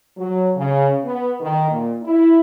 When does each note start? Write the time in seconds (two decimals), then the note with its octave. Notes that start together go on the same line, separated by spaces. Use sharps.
0.16 F#3
0.56 C#3
1.03 B3
1.40 D#3
1.69 A#2
2.04 E4